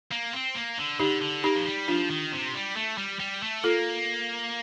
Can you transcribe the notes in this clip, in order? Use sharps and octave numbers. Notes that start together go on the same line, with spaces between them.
A#3
C4
A#3
D3
D3 D#4 G4
D3
A#3 D#4 G4
F3
G3
F3 D4 F4
D#3
C3
G3
A3
G3
G3
A3
A#3 F4 A4